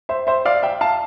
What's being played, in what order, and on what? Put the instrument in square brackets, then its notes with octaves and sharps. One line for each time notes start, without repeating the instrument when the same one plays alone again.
[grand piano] C5 E5
C5 E5
D5 F5
E5 G5
F5 A5